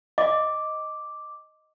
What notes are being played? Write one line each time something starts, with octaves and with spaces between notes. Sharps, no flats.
D#5 D6